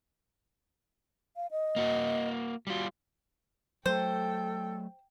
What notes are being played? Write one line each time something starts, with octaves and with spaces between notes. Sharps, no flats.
F5
D#5
A#3 F#4
G3 F4 F#4
F#3 A3 A4 C5 G5